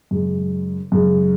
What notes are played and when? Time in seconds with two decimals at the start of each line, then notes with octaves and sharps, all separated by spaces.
0.11 F#2 C#3 G#3
0.92 F#2 C#3 G#3